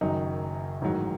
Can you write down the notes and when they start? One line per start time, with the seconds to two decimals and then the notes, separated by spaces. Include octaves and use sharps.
0.01 F#1 F#2 D#3 F#3 D#4
0.81 A1 G#2 D#3 F#3